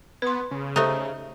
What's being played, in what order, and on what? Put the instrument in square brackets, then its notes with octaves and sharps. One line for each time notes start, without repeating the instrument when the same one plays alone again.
[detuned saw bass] B3 [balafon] B4 C6
[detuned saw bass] C#3
[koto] A3 D#4 [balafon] G4 A4 C5